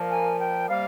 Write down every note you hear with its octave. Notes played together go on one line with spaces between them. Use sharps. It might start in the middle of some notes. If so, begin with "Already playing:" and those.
Already playing: A#2 F3 A#3
G#5
G5
C3 G3 A#3 F5